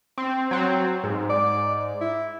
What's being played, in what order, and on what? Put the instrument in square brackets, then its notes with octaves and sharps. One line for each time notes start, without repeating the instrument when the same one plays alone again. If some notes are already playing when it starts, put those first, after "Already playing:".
[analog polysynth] C4
F#3 C4
G#2
[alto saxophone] D5
E4